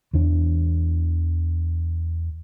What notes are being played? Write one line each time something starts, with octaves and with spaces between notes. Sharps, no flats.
E2 E3 D4